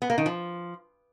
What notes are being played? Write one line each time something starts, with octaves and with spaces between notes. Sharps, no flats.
B3
A#3
D#3
F3